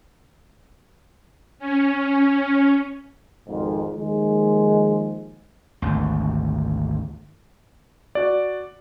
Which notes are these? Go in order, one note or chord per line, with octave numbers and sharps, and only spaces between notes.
C#4
G#1 F2 G#2
D#2 D#3 F3 G#3
G#1 D2
F#4 D5